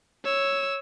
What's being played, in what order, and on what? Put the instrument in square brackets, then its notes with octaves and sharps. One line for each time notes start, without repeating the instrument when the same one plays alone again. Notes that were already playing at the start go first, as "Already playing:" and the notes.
[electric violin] C#5 E6